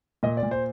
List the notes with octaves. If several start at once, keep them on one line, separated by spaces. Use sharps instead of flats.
A#2 D#5
D5
A#2
C5